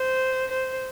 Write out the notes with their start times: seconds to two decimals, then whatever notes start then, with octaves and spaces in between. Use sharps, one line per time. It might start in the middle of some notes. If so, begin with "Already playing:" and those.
Already playing: C5
0.51 C5